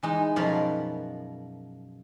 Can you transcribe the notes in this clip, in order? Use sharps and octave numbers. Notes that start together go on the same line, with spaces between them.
E3 G#3 D#4
F#2 B2 F3 A#4 B5